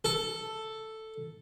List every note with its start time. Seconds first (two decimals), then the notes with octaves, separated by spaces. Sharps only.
0.05 A4